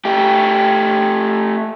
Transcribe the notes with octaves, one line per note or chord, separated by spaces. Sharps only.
A3 G4